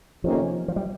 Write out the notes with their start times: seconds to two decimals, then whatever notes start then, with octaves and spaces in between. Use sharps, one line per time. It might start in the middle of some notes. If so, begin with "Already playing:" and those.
0.24 F2 C3 D#3 F3 A#3 C#4
0.68 F3
0.76 G3